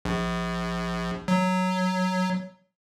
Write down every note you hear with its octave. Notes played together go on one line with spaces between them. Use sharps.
A#1
F#3